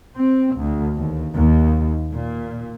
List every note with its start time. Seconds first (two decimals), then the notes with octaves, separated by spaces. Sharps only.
0.15 C4
0.56 D2
0.97 D#2
1.35 D#2
2.12 A#2